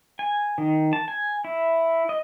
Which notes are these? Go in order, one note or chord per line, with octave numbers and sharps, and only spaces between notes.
G#5
D#3
A5
G#5
E4
D#5